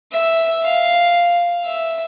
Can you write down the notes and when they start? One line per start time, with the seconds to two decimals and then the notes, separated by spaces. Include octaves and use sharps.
0.13 E5
0.63 F5
1.65 E5